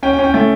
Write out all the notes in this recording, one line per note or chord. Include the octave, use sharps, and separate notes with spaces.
C#4 G5
G5
C#4
G5
A3 G5